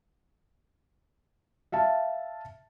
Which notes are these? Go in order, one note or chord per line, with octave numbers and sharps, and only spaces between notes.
E5 F5 A5